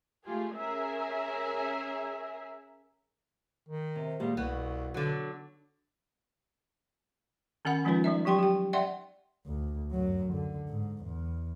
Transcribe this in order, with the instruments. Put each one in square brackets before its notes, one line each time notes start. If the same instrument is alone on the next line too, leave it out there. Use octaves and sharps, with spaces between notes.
[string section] A3 F4 G4 G#4
C#4 G#4 A#4 E5
[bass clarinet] D#3
[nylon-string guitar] C3
A#2 G3 G#3
[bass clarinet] C2 [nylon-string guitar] B2 [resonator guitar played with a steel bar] B3
[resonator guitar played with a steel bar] D3 F#3
[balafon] D#3 C#4 A#4 F#5 B5
F3 G#3 C#4 D#4 F4 B4
G3 D#4 E5
F#3 G4 G5 C6 C#6
G4 G5
D5 E5 F#5 G5 C6
[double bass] D2
F#2 F#3
D3
G#2
E2